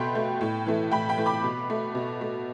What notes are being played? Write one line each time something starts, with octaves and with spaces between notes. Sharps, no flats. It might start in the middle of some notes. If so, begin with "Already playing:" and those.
Already playing: B2 A3 G5 B5 C6
A3
A2
E3 A3
A2 G5 B5
G5 B5
E3 A3
B5 D6
B2
A3
B2
A3